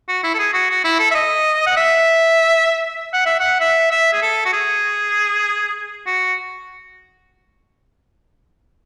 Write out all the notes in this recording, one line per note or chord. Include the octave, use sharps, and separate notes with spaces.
F#4
E4
A4
G#4
F#4
F#4
E4
A4
E5
D#5
F#5
E5
F#5
E5
F#5
E5
E5
G#4
A4
F#4
G#4
F#4